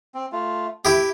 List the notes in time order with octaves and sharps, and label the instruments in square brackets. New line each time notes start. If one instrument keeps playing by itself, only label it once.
[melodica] C4
A3 F4
[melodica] A3 [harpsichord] E4 G4